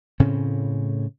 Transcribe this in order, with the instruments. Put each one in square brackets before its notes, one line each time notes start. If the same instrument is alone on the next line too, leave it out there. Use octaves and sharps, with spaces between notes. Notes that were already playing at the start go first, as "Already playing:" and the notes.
[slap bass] A2 C#3 C4 C#4